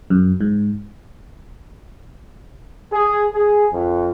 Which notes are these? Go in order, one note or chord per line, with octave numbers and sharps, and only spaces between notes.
F#2
G#2
G#4
G#4
F2